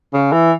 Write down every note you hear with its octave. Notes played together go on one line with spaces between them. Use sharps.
C#3
E3